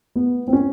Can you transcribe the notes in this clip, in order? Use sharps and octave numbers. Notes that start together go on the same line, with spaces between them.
B3
C4
C#4